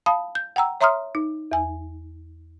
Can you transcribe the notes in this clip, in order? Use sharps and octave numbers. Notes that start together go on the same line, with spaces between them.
F5 A5 B5 D#6
G6
F#5 G5 A#5 E6
C#5 E5 A#5 C6 D#6 F6
D#4
E2 G#5